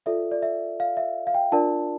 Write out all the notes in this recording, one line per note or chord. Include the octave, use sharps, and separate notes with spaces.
F4 A4 D5 E5
D5
E5
F5
E5
F5
G5
D4 F4 A#4 D5 A5